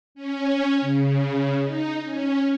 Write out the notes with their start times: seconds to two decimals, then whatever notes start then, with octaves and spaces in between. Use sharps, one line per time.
0.15 C#4
0.81 C#3
1.63 D#4
2.02 C#4